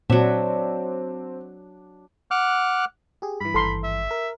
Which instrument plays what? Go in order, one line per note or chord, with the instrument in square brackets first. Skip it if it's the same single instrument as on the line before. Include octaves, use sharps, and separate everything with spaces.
[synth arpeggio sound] A#2 [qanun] F#3 E5 [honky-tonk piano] C4 [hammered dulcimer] D4
[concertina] F#5 D6 F6 F#6
[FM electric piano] G4 G#4
[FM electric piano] G2 E3 [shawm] B5
[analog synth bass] G#1 [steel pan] A4 A#5 C6
[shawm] E5
[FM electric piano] A#4